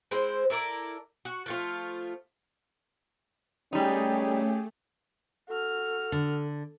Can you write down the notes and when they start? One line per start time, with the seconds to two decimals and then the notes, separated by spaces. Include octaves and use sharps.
0.11 G#3 C4 E4 C5
0.50 E4 A4 A#4 D5
1.25 F#4
1.46 F3 A3 F4
3.73 G3 A3 C#4 D#4 G4 G#4
5.49 F#4 A4 F6
6.12 D3